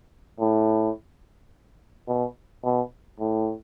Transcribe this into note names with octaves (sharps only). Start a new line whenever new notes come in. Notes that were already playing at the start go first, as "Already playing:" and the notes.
A2
B2
B2
A2